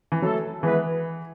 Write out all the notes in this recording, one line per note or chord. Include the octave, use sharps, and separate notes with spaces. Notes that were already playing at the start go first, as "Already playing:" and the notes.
E3
F#3 A3 E4 A4
E3 G#3 B3 E4 G#4 B4